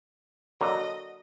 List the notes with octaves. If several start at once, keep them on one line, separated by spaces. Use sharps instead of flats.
D3 F#3 A#3 D#5